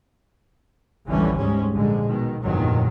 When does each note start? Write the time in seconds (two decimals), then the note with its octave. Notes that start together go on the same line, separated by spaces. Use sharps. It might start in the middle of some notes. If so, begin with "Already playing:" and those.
1.07 F1 A#1 D3 E3 G3 C#4
1.37 D2 G#2 G3 G#3 C#4
1.73 A#1 G#2 D3 G#3
2.06 B2 D#3
2.43 G1 F2 A#2 D#3 F#3